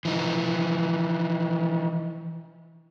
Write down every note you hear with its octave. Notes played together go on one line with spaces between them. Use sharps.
E3 F3 D#4